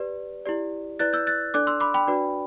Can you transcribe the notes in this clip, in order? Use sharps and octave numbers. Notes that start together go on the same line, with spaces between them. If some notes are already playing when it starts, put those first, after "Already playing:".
Already playing: G4 B4 D5
E4 G4 D5
E4 B4 D5 F#6 A6
E6 G6
F#6 A6
D4 A4 D5 D6 F#6
C6 E6
B5 D6
G5 B5
D4 F#4 B4 D5